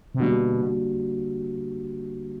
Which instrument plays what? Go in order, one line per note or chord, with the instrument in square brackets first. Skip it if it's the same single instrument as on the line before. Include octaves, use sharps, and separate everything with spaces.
[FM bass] C3
[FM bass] B2 [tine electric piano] D3 G3 A#3 D4 F#4